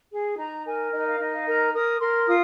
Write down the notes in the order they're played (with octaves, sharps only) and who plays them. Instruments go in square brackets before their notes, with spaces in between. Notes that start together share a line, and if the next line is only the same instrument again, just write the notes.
[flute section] G#4
D#4 A#5
A#4 G#5
D#4 D#5
F5
D#4
F5
A#4 A#5
A#4 D#6
A#4 C6
F4 D#6